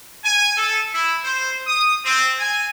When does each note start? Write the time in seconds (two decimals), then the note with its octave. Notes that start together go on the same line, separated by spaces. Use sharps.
0.25 G#5
0.57 A4
0.93 E4
1.24 C5
1.67 D#6
2.05 C4
2.39 G#5